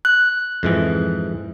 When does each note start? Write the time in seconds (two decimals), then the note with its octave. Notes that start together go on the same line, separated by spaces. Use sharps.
0.05 F#6
0.63 F2 G#2 E3